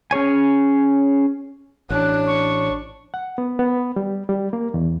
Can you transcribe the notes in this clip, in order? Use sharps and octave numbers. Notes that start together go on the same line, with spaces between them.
C#4 G#4 C#5 G#5
A1 D4 C#5 F#6
C#6
F#5
B3
B3
G3
G3
A#3
E2